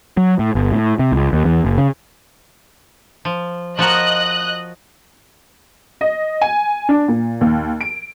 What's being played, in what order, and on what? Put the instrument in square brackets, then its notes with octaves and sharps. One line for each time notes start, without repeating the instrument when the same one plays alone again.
[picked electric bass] F#3
A2
G1
A2
C3
C#2
D#2
E2
F#1
C#3
[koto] F3
[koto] F3 F#4 A#4 [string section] D#5 F#6
[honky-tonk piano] D#5
G#5
D4
A#2
D#2
D7